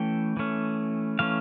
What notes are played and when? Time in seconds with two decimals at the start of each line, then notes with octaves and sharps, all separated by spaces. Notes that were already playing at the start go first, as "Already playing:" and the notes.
Already playing: E3 A3 C#4 G5
0.37 E3 A3 C#4
1.19 E3 A3 C#4 F5